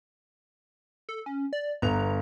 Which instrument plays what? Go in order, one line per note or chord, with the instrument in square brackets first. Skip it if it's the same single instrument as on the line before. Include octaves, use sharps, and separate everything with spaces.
[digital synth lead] A4
C#4
D5
[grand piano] G1 B3 F7 [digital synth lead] A#5